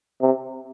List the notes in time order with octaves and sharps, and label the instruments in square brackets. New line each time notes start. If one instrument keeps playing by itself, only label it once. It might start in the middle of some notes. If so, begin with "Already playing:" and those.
[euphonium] C3